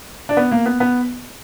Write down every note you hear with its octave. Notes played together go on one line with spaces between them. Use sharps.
D4
B3
A#3
B3
B3